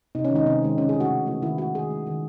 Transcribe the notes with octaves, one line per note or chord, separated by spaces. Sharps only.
C3 D#4
C#4
D#3 G#3 D#4
C3 C4
D#3 G#3
C#3 C#4
G#4
E3 A3
F#4
C#3
E3 A3
D#3 E4
G#3 F#4
D#3 G#4
G#3
D#3